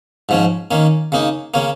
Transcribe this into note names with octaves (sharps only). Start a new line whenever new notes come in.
G#2 F3 C#4
D#3 A#3 C#4
C#3 A#3 D#4
C#3 A#3 C#4